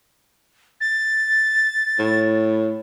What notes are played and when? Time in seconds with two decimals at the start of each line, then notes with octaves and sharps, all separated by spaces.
0.81 A6
1.99 A2